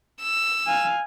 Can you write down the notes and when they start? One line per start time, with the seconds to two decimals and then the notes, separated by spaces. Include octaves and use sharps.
0.23 E6
0.66 F5 G#5